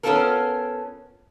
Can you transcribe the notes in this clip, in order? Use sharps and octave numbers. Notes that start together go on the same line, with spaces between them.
B3 C#4 E4 F4 A4 A#4